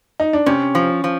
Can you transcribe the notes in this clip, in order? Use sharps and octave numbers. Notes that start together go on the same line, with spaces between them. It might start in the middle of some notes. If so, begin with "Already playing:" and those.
D#4
D4
C3 C#4
F3
F3